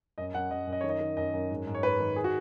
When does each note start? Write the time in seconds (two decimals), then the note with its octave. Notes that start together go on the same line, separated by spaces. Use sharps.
0.18 F#2 D#5
0.34 F#2 F#5
0.51 F#2 D#5
0.67 F#2
0.73 D#5
0.81 C#5
0.84 D#3
0.89 D#5
1.00 D#3
1.17 F#2 D#5
1.34 F#2
1.50 G#2
1.67 G#2
1.75 C#5
1.83 G#2 B4
2.00 D#3
2.16 G#4
2.24 F#4